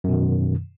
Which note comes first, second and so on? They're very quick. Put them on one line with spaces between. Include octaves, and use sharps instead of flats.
F#2 B2 D#3